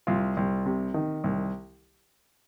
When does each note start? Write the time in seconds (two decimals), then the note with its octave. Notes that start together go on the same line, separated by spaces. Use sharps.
0.07 C2 F4
0.37 C2
0.66 C3
0.94 D#3
1.24 C2